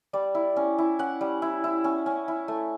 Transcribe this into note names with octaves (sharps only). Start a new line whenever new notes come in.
G3 D5
E4
C#4
E4
C#4 F#5
G3
E4
E4
C#4
C#4
E4
A3